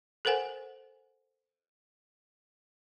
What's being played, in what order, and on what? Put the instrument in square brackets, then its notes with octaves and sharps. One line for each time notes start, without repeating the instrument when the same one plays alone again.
[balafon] A4 A#4 C5 F#5 G#5